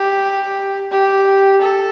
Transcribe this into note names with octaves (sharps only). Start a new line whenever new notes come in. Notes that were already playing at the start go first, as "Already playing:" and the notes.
Already playing: G4
G4
A4